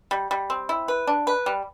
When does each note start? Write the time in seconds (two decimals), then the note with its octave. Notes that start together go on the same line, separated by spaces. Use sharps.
0.11 G3
0.31 G3
0.50 C4
0.69 E4
0.88 B4
1.07 D4
1.27 B4
1.46 G3